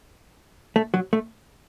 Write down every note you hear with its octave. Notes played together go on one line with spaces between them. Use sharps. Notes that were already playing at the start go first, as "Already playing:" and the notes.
A3
F#3
A3